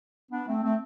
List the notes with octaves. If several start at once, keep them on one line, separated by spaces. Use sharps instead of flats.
B3 D4
A3 C4
A3 C4